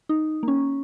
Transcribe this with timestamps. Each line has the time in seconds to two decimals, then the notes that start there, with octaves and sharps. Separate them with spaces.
0.09 D#4
0.43 A#3
0.48 C#4